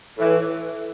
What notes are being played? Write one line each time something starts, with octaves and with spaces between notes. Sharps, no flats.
A2 E3